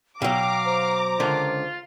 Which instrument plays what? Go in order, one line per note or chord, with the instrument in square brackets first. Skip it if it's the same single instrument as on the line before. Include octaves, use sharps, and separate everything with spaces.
[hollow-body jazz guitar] B2 F#3 [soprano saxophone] F5 [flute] G5 [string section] A#5 D6
[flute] C5
[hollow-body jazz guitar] C#2 D3 A#4 [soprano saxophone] F4